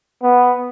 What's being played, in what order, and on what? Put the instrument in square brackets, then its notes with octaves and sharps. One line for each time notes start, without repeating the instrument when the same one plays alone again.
[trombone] B3